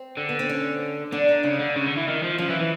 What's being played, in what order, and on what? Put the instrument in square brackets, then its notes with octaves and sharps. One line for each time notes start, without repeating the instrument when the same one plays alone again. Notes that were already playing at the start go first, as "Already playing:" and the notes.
Already playing: [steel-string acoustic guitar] C4
[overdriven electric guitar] D3
[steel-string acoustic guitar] B3
C4
C#4
[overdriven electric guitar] D3 [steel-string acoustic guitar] D4
[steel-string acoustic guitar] D#4
[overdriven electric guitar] C#3 [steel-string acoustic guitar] D#4
[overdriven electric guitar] D3
C#3
D3
E3
D#3
F3
[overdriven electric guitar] F3 [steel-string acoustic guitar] C#4
[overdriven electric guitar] E3
E3